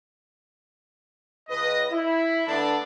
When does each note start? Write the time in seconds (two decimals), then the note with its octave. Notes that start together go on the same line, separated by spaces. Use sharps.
1.49 C#2 B4 D#5
1.90 E4
2.47 D3 A3 B3 D4